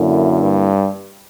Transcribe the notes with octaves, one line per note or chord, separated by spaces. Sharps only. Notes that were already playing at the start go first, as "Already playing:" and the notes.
Already playing: F#2 D3 A#3 E4
G2